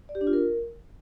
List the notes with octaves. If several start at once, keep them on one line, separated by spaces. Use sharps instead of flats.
D5
G4
D4
F4
A#4